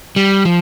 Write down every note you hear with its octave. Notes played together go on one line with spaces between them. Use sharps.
G3
F3